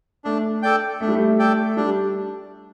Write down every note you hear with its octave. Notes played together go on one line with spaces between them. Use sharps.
A3 D4
A4 D5 G5
A3 D4
G3
A3
A4 D5 G5
G3 D4